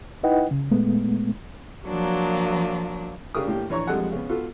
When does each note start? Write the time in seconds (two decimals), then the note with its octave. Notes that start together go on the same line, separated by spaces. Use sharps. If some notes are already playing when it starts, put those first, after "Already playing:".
0.23 D#4 E4 B4 D#5 F#5 G5
0.51 C#3
0.71 A#2 G#3 A3 B3
1.87 F3 F#3 A#3 D4
3.35 C#3 D4 G4 A#4 D#6
3.47 A2 A#3 G4
3.69 A#1 E3 C#5 A#5 C#6
3.87 F2 G3 G#3 A4 F#5
4.12 C#3 B3
4.29 B3 F4 F#4 A4